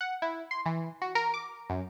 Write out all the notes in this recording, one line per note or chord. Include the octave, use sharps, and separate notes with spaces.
F#5
E4
C6
E3
F#4
A#4
D6
F#2